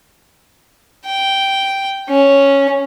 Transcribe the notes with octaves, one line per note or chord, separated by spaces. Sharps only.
G5
C#4